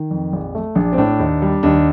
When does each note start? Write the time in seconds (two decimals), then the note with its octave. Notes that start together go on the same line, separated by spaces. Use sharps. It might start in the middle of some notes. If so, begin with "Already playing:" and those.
Already playing: D#3
0.11 F2
0.33 A#1
0.55 A3
0.75 A#1 D4
0.93 C4
0.98 A2 D4
1.19 D#2
1.42 G3
1.63 D#2 D4